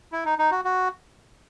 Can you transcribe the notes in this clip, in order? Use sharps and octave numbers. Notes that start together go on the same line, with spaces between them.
E4
D#4
D#4
F#4
F#4